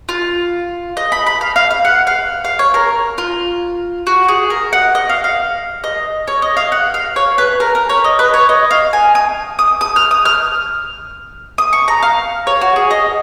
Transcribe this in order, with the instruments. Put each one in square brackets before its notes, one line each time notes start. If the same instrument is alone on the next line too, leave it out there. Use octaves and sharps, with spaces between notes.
[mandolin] F4
D#5
B5
B5
F5
F5
F5
F#5
F5
F5
C#5
A#4
F4
F#4
G#4
A#4
F#5
D#5
F5
F5
D#5
C#5
D#5
F5
F#5
F5
C#5
B4
A#4
A#4
C#5
D#5
B4
C#5
D#5
F5
G#5
D#6
D#6
D#6
F6
D#6
F6
D#6
C#6
A#5
F5
C#5
F#4
G#4
D#5